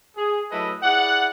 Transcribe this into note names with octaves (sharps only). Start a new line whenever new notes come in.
G#4
F#3 A3 E4 A4 B4 D#5
E4 G#4 D5 F#5